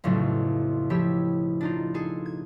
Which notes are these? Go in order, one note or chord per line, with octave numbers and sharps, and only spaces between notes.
B1 F2 A2 C#3 F#3 A3
F3 E4 G4 C#5 E6
D4 D#4 F4
G#4 A4
G#6